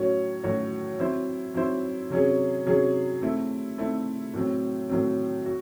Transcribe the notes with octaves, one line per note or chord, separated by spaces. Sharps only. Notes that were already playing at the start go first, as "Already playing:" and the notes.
Already playing: A2 F#3 C#4 F#4 C#5
A2 F#3 C#4 F#4 C#5
F#3 C4 E4 C5
F#3 C4 E4 C5
C3 F#3 C#4 G#4
C3 F#3 C#4 G#4
A3 C4 E4
A3 C4 E4
A2 F#3 C4
A2 F#3 C4
F#4